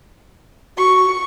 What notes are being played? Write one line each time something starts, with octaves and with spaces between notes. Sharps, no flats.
F#4 C#6